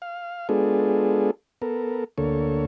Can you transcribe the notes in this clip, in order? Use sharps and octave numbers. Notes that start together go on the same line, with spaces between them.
F5
G#3 B3 D4 F4 G#4 A4
B3 A4 A#4
D2 D3 A#3 A4 C#5